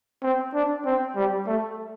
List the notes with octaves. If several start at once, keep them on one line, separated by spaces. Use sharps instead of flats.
C4
D4
C4
G3
A3